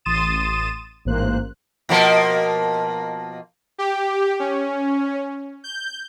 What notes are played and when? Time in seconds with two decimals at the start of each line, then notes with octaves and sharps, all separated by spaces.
0.05 A1 C6 D#6 A6 D#7 E7
1.05 A1 G#2 A#3 C5 F#6
1.89 B2 F3 A#3
3.78 G4
4.40 C#4
5.64 G6